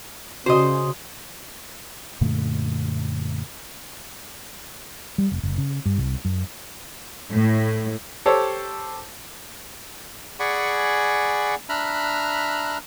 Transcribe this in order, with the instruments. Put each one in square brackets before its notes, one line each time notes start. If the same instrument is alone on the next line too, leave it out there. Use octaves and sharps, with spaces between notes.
[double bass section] C#3 [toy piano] F#4 [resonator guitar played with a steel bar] C5 D#5
[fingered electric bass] F#2 A#2 D3 A3
[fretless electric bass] G3
F1
F#1
C#3
G2
C2
F#2
[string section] A2
[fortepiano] G4 A4 C5 C#5
[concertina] G#4 D5 F#5 G#5 B5 C#6
D4 E5 A#5 B5 F6 F#6